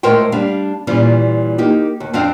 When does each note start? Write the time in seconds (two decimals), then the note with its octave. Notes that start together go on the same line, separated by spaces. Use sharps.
0.03 A2 G#3 A#4 C5 C#5 G5
0.32 G3 D4 F5
0.87 A#2 E3 G3 C#4 F4
1.58 A#3 D#4 G4
2.00 D#2
2.13 F2 C4 D4 F5